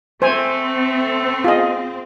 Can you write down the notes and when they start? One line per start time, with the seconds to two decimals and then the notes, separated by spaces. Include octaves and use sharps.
0.22 A3 C4 C5 G#5
1.44 F4 G#4 D#5